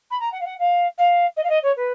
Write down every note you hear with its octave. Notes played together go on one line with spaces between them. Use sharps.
B5
A#5
F#5
F5
F#5
F5
F5
D#5
F5
D#5
C#5
B4